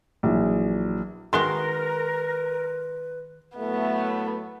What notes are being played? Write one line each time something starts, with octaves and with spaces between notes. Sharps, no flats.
A#1 E3 F#3
D#3 G#3 F#4 A#4 B4 C6 G7
A2 F#3 A3 B3